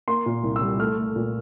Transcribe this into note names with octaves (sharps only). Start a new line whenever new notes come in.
A#3 C6
A#2
C2
E6
G3
A3 F6
A3
A#2